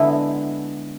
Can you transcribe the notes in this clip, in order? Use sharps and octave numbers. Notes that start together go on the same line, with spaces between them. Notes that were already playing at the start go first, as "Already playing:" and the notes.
Already playing: D3 G#3 B3 E4